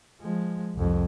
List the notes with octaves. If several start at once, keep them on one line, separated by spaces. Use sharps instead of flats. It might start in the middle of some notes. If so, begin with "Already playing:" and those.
F3 G#3
C2 F2